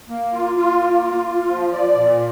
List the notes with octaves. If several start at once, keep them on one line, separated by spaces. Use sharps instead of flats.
A#3
F4
F4
A#3
F4
F4
F3
D5
A#2